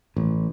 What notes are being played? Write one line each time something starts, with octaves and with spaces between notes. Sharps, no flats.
A1